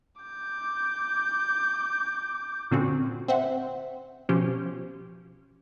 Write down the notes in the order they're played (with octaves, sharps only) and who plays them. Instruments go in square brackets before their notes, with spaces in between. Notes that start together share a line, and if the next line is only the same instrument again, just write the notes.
[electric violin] D6 G6
[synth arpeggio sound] A#2 D3 C4 C#4 F#4
C4 C5 E5 F#5
B2 F3 C#4 G4